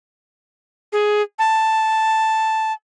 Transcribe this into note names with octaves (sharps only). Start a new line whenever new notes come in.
G#4
A5